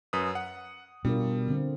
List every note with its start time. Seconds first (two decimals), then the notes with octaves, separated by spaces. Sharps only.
0.13 F#2 B4 D#6
0.35 F#5
1.05 B2 G3 D4 F4 A#4
1.48 D3 C4